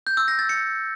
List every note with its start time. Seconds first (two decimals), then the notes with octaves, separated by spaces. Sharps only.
0.07 G6
0.17 E6
0.28 A#6
0.39 A6
0.49 C#7